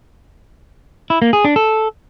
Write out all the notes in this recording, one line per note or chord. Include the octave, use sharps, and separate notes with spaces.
E4
A#3
G#4
D4
A4